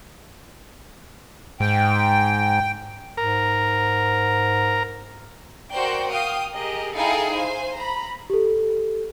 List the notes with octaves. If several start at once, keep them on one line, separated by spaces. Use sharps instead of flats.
G#2 G5
G#2 A#4
F#4 A#4 C5 D5 G5
F5 G5 D#6
G4 G#4 A#4 D#5
D#4 E4 G#4 A4 F5 G5
C5 F5 G#5
A#5 B5
G4 A4